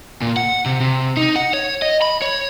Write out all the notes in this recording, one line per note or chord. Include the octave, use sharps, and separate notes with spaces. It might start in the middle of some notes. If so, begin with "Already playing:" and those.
A#2
F#5
C3
C3
D#4
F#5
C#5
D#5
B5
C#5